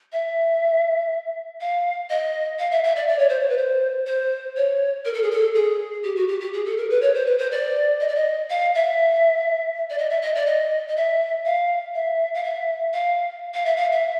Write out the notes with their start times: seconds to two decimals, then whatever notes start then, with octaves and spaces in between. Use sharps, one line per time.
0.12 E5
1.61 F5
2.10 D#5
2.59 F5
2.71 E5
2.84 E5
2.96 D5
3.08 D5
3.19 C#5
3.29 C5
3.40 C#5
3.49 B4
3.57 C5
4.07 C5
4.56 C#5
5.05 A#4
5.14 A4
5.23 G#4
5.31 A4
5.55 G#4
6.04 G4
6.16 F#4
6.28 G4
6.40 G4
6.53 G#4
6.65 A4
6.77 A#4
6.90 B4
7.02 C#5
7.14 C5
7.26 B4
7.38 C5
7.51 D5
8.01 D#5
8.08 D5
8.15 D#5
8.50 F5
8.75 E5
9.90 D5
9.98 D#5
10.10 E5
10.22 D#5
10.35 D5
10.46 D#5
10.88 D#5
10.96 E5
11.45 F5
11.95 E5
12.34 F5
12.44 E5
12.93 F5
13.54 F5
13.65 E5
13.76 F5
13.92 E5